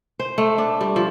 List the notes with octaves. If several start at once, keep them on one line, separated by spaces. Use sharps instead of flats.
C5
A3
D4
G3
F3